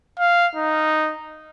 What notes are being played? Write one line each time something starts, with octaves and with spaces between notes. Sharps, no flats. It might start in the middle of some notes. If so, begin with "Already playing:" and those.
F5
D#4